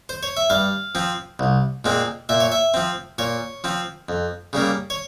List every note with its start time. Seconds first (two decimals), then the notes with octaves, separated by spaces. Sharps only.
0.09 C5
0.23 C#5
0.37 E5
0.50 G2 F5
0.95 F3 C4
1.39 C2
1.85 A#2 G#3 C4
2.29 A#2 E5
2.40 C#5
2.52 E5
2.74 F3 C4
3.18 A#2 C#5
3.64 F3 C4
4.09 F2
4.53 C#3 G3 A#3
4.90 C#5